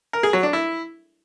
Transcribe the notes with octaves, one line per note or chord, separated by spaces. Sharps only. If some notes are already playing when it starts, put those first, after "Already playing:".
A#4
G#4
F#3
D4
E4